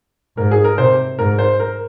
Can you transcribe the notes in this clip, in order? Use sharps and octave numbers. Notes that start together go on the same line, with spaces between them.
G#2 A#4
G#4
A#4
C3 C5
G#2 A#4
C5
A#4